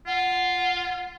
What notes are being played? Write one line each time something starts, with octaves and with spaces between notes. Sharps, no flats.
F4 F#5